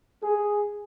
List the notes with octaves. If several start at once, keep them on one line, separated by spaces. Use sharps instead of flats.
G#4